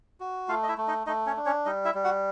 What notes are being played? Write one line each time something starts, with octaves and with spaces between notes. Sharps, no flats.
F#4
A3 F4 F5
D#5
E4 E5
A3
D#4 D#5
A3 D#4 D#5
C#4 C#5
D4
C#4 C#5
G3 D#4 D#5
E4 E5
G3
F#4 F#5